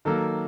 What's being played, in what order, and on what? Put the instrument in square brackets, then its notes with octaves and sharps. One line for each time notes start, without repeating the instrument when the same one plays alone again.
[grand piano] D#3 F#3 A#3 A4